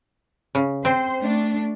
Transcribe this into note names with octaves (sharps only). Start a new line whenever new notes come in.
C#3
C4 C5
A3 D4